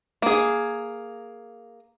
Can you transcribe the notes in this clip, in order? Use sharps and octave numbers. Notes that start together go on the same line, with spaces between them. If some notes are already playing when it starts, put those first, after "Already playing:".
A#3 G#4